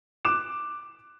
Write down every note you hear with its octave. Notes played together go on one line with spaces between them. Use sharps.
D6 F#6 E7